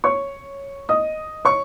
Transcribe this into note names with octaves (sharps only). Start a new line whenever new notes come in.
C#5 C#6
D#5 D#6
C#5 C#6